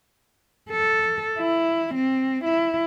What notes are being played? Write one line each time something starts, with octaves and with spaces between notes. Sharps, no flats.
A4
E4
C4
E4